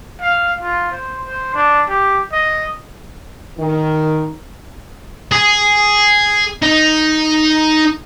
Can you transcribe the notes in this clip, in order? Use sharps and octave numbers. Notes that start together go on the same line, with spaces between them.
F5
F4
C5
C5
D4
G4
D#5
D#3
G#4
D#4